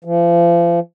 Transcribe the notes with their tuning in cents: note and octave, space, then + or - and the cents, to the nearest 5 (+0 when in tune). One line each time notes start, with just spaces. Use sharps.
F3 -35